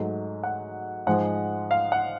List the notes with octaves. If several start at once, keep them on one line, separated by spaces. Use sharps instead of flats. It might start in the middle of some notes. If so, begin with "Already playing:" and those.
Already playing: G#2 F#3 A3
F#5
G#2 F3 G#3 F#5
F5
F#5